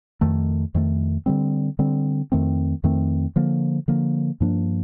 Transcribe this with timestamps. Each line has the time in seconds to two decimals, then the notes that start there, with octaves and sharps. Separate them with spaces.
0.21 F2 D#3 A3
0.75 F2 D#3 A3
1.26 D3 G3 C4
1.79 D3 G3 C4
2.32 F2 D#3 A3 C4
2.84 F2 D#3 A3 C4
3.36 D3 F3 A#3
3.88 D3 F3 A#3
4.40 G2 F3 A#3 D4